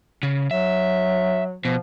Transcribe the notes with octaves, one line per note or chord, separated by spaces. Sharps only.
C#3
F#3 E5
B2 F3